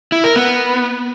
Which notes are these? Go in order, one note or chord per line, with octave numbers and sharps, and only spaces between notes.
E4
A#4
B3